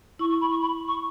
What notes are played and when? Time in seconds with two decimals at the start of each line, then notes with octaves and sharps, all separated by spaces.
0.19 E4 C#6
0.30 C#6
0.41 B5
0.51 C#6
0.61 B5
0.88 C#6